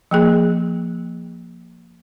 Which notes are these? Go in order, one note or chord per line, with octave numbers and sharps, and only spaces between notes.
F3 A#3 G#4